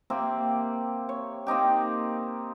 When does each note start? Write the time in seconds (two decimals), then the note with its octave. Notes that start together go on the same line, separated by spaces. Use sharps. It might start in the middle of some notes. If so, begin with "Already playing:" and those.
0.10 A#3 C4 G4 E5
1.09 C#5
1.47 A#3 C4 D#4 G4